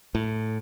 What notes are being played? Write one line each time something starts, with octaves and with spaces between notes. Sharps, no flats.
A2